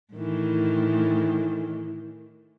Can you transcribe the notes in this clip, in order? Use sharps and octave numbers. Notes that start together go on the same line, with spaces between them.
A2 D#3 E3